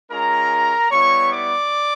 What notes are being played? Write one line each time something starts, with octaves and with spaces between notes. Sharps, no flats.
G#3 C#4 F4 A#4 A#5
G3 B3 E4 C#5 C#6
D5 D6